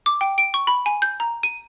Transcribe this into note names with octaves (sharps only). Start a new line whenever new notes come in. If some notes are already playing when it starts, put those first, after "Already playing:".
D6
G5
D7
C#6
B5
G#5
G6
A#5
D#7